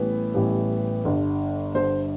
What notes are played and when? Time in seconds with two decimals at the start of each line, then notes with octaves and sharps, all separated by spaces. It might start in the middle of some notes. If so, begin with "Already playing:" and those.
Already playing: A1 A2 E3 G3 B3 B4
0.34 A1 A2 E3 G3 B3
1.04 G1 G2 D3
1.75 G1 G2 D3 C5